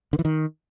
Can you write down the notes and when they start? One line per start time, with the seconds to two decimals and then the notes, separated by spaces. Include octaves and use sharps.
0.13 D3
0.19 E3
0.25 D#3